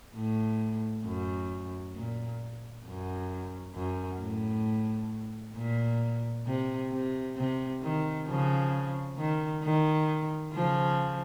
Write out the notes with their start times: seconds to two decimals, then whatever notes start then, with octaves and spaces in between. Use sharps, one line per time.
0.15 A2
1.04 F#2
1.95 A#2
2.86 F#2
3.75 F#2
4.21 A2
5.56 A#2
6.47 C3
6.92 C3
7.37 C3
7.83 D#3
8.27 C#3 F3
9.18 D#3
9.63 D#3
10.53 C#3 F3